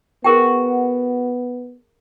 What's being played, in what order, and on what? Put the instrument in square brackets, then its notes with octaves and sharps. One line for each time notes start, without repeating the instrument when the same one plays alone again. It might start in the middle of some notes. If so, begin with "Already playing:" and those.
[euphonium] B3 [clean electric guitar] F#4 [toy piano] G#4 A#4 G5